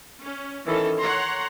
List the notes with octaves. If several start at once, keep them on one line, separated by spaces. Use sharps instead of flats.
C#4
D#3 E3 C#4 A4
C#5 F#5 A#5 C6